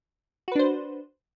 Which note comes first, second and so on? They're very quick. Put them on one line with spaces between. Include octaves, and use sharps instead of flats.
F#4 B4 D4 C5